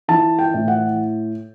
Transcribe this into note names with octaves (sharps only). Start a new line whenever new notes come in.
E3 A5
G5
A2
F#5